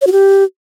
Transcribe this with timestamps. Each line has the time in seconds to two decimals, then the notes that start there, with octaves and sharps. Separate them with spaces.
0.02 C#5
0.07 F#4
0.12 G4